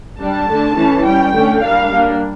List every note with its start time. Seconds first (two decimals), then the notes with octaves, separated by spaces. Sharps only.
0.19 G3 D4 A5
0.48 D3 A3 D4
0.76 E3 A3 C#4
1.03 G3 C#4 G5
1.32 D3 A3 C#4
1.60 G3 A#3 D4 F5
1.88 G3 A#3 D4